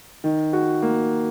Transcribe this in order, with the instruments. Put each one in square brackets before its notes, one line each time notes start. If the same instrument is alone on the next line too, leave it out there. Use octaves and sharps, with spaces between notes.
[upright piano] D#3
F#4
A#3